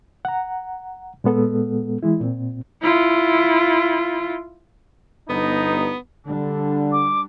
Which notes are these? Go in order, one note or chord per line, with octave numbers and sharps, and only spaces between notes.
F#5 A#5
A#2 G#3 B3 A4
E3 G#3 E4
A#2 C4
E4 F4
G1 G2 B3 D#4
D3 G3 D4
D6